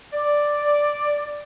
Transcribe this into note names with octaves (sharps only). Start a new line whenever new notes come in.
D5